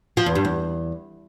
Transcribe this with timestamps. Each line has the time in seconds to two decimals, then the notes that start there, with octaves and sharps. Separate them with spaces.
0.17 F3
0.26 E2
0.35 G2
0.45 E2